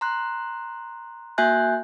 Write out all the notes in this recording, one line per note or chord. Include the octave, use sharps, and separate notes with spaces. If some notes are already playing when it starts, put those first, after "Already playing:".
A#5 C6 F#6
A#3 F#4 E5 G#5 F#6 G6